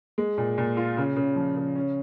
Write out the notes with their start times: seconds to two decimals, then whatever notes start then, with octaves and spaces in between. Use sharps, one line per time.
0.18 G#3
0.38 A#2
0.58 A#2
0.77 F4
0.97 C#3
1.17 C#3
1.36 F3
1.56 C#3
1.76 C#4